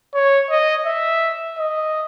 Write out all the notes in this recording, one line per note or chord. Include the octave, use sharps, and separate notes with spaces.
C#5
D#5
E5
D#5